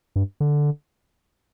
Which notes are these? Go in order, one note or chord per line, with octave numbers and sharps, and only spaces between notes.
G2
D3